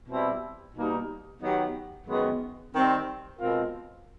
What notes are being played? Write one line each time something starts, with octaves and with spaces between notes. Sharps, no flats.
B2 G3 C4 E4
B2 G3 A#3 D#4
D#3 F#3 B3 D#4 G4
F#2 D#3 G#3 B3
D#3 G3 C4
B2 G#3 C4 F4 A#4